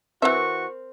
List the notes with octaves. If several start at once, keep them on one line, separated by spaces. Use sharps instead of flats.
E3 C4 F#4 A#4 E5 C#6